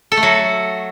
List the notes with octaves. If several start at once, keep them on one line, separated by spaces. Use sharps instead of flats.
A4
A3
F#3